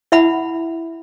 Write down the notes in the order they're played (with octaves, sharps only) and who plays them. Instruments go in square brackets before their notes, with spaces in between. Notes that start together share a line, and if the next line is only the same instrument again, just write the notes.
[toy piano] E4 E5 F#5 B5